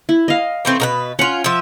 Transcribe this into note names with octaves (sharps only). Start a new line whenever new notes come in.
E4
D#5 F5
E3 A3 C4
B2 A#4 B4
C#4 F4 F#5
F3 E5